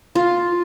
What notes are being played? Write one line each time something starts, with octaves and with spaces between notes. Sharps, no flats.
F4